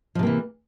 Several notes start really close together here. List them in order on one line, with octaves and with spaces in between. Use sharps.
F3 C3 A#3 E3